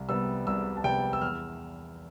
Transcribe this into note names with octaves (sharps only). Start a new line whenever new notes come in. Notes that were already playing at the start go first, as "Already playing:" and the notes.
Already playing: C2
C3 G3 B3 E6
C2 E6
A5
C3 G3 B3 G5
E6
E2 F6